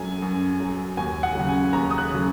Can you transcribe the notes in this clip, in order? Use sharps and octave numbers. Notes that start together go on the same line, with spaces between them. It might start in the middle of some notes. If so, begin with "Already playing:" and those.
Already playing: F#2 F#3 G#5
F#2
F#3
D#2 G#5
F#5
C#3 F#3
G#5
D#2 A#5
D#6
F#6
C#3 F#3